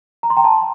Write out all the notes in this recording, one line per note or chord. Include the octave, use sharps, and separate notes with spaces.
A#5
C6
G5 A#5
A5 C6